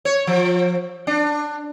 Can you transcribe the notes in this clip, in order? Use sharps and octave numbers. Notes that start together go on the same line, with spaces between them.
C#5
F3
D4